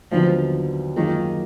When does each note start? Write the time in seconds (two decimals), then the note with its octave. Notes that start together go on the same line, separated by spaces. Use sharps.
0.12 D#2 D3 F3 F#3 B3
0.97 F#2 D#3 F3 A#3 D#4 G#4